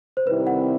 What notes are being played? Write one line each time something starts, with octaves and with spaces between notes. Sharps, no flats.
C5
C3 D#3 G3 C4 E4 B4
F#5